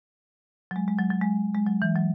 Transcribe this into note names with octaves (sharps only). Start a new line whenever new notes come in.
F#3
G#3
G#3
F#3
F#3
G#3
G#3
F#3
E3
F#3